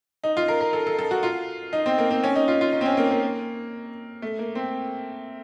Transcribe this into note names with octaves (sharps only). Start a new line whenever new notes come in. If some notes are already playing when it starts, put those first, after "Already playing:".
D#4
F4
A#4
A#4
A4
A4
A4
F#4
F4
D#4
C4
A#3
C4
C#4
D#4
F4
F4
D#4
C4
C#4
A#3
A#3
A3
A#3
C4